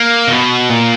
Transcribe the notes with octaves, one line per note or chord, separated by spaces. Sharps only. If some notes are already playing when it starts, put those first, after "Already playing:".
Already playing: A#3
B2
A#2